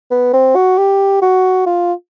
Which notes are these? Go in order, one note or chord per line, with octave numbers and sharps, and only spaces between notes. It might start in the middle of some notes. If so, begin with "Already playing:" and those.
B3
C4
F#4
G4
F#4
F4